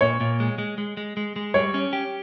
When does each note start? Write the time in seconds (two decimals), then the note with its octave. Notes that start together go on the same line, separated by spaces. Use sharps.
0.01 A#2 C#5
0.20 A#2
0.40 G#3
0.58 G#3
0.78 G#3
0.97 G#3
1.17 G#3
1.36 G#3
1.54 G3 C#5
1.74 C#4
1.93 G4